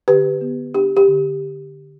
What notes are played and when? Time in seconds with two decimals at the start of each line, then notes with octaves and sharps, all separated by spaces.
0.08 D3 G4 B4
0.41 B3
0.74 D4 G4
0.97 G4
1.08 D3